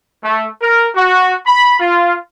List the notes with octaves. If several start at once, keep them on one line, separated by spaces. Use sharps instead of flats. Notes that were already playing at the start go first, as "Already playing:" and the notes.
A3
A#4
F#4
B5
F4